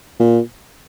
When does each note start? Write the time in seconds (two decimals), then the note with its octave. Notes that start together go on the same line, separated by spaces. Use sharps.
0.19 A#2